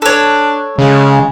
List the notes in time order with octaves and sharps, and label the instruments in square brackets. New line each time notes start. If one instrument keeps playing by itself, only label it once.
[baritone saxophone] D4 [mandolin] A4 C#5
[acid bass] C#3 [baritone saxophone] G#3